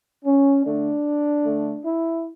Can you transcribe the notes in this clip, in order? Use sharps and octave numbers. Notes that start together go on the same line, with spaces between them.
C#4
D3 A3 D4
D3 A3
E4